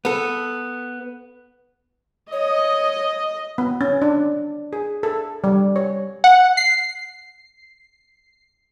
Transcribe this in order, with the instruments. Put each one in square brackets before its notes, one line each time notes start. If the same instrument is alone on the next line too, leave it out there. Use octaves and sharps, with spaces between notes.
[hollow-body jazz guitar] B3 A4
[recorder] C#5 [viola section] D#5
[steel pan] B3
C#4
D4
G#4
A4
G3
C#5
[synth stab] F#5
C7